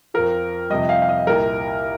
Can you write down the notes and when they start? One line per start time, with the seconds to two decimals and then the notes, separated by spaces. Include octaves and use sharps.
0.14 F2 F3 A#4
0.70 F2 C3 G3 D#5
0.89 F5
1.02 F5
1.09 D#5
1.27 C2 A#2 G3 A#4